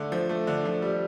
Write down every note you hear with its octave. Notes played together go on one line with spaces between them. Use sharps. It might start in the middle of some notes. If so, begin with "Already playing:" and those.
Already playing: D3 A3
F3
A3
D3
F3
G3